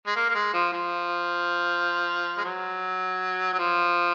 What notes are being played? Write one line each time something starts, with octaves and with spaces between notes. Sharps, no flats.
G#3
A#3
A#3
G#3
F3
F3
G#3
F#3
F#3
F3